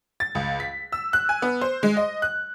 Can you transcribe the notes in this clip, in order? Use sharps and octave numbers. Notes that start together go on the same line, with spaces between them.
A6
C#2
B6
E6
F#6
G#5
B3
C5
G#3
D#5
F#6